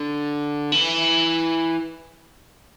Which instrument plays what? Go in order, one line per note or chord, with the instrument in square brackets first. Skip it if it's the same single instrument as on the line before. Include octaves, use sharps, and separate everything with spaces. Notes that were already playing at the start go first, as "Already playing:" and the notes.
Already playing: [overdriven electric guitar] D3
E3